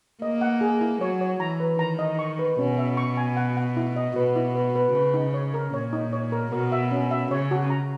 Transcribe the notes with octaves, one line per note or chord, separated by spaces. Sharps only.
A#3 D#5
F#5
G#4
E4
F#3 C#5
C#5
E3 A#5
B4
D#3 A#5
D#5
C#6
B4
B2 C#4
E5
C#6
G#5
F#5
F#5
E4
D#5
B2 B4
E4
B4
B4
C#3 B4
D#4
C#5
A#4
A#2 C#5
D#4
C#5
A#4
B2 A#4
E5
C#4
E5
C#3 C#5
F#4
A#5